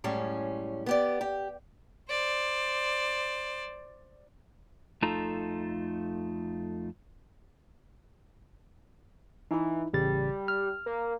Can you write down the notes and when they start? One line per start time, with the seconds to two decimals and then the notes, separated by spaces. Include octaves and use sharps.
0.04 F#2 A2 G3 G#3 C#4
0.86 B3 G4 D5
1.21 G4
2.10 C5 D5
5.02 F2 A3 D#4 F4 A4 A#5
9.51 E3 D#4 E4
9.93 A1 C#3 G3 A6
10.48 F6
10.86 A#3